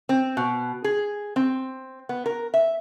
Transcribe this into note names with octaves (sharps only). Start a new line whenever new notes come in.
C4
B2
G#4
C4
B3
A#4
E5